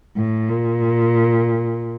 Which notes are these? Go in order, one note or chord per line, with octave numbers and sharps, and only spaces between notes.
A2
A#2